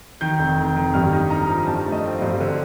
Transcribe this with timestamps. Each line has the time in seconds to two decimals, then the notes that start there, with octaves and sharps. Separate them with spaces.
0.21 D#3 G6
0.39 F1
0.58 D#3
0.76 D#3
0.94 G2 F6
1.12 D#4
1.30 D#4 A#5
1.48 F3
1.67 G2 A5
1.85 A3
1.92 D#5
2.04 C4
2.15 F5
2.22 G2
2.40 D3